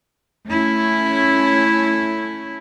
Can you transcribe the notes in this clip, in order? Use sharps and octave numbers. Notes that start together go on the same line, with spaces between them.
A3 C#4 E4